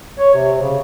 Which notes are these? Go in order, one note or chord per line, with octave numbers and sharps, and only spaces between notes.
C#5
C3
C#3